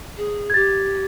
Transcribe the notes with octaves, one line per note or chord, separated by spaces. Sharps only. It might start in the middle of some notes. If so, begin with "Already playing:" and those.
G#4
G#6
G4 A6